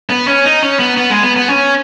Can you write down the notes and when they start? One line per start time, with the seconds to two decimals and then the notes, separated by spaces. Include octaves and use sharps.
0.10 B3
0.28 C#4
0.46 D#4
0.62 C#4
0.80 B3
0.97 B3
1.10 G#3
1.23 B3
1.36 B3
1.49 C#4